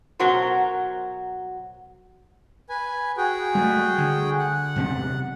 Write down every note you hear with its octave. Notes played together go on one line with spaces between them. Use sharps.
B2 F#3 F#4 A#4 C5
B4 G#5
F#4 G#4 G5
G3 A3
D3
F#5
E2 C3 G3